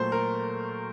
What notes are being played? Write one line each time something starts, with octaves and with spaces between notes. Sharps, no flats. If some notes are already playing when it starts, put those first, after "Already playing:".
Already playing: A#2 F#3 A3 C5
A#4